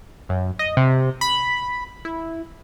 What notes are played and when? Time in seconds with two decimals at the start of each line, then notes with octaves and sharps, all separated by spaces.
0.29 F#2
0.59 D#5
0.77 C3
1.21 B5
2.05 E4